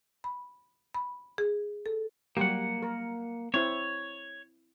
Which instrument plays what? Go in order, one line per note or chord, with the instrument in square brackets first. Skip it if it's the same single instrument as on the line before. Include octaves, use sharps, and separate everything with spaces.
[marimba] B5
B5
G#4
A4
[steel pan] F#3 G3 G4 [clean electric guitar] A#3 F#5
[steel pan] A#4
[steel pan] C4 E4 C5 [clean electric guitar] C#5